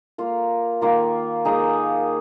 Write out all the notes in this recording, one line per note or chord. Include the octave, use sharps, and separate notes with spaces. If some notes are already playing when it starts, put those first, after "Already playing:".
A#3 F4 A#4
D#3 A#3 F4
A#3 D#4 G#4